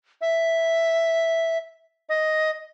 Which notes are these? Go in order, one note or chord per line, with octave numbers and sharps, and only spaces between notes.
E5
D#5